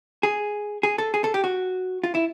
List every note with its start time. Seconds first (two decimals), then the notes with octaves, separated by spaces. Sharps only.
0.23 G#4
0.83 G#4
0.98 A4
1.14 G#4
1.24 A4
1.34 G4
1.44 F#4
2.04 F4
2.15 E4